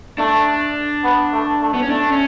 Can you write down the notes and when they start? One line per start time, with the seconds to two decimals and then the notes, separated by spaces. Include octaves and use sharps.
0.18 A3 D4
1.04 B3
1.33 A3
1.62 A3
1.74 B3
1.82 C#4
1.90 A3 D4
2.12 C#4